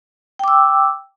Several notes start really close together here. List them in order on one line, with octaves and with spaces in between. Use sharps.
G5 D6 E6